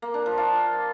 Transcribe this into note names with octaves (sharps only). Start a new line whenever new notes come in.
A#3
D4
F3
F4